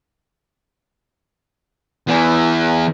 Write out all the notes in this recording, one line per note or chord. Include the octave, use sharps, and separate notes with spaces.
E2 E3